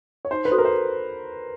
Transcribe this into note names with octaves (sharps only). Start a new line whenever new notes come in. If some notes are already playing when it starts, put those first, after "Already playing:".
C#5
D#4 C5
B4
F#4 A4 C5
A#4
C5